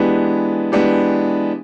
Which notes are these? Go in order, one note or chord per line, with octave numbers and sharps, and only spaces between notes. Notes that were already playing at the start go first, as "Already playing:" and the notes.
Already playing: E3 G#3 B3 D4 G4
E3 G#3 B3 D4 G4